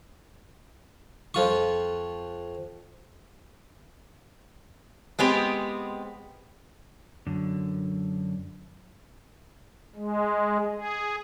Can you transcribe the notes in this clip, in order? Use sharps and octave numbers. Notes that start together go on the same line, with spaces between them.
F2 F4 C#6
G#3 B3 C4 G4
F#2 D3
G#3
G#4